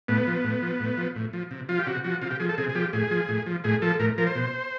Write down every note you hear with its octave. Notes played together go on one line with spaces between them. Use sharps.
A2 B3
F3
A2
F3
A2
F3
A2
F3
C3
F3 F4
G4
C3 F#4
F3 F#4
C3 F4
G4
F3 G#4
A4
C3 G#4
G#4
F3 G4
A2 G#4
F3
A2
F3
A2 G#4
F3 A4
A2 A#4
F3 A#4
C5
B2